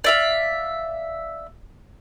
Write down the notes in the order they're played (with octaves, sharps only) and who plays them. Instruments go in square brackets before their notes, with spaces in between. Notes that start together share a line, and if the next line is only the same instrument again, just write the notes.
[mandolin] D5 E5 F5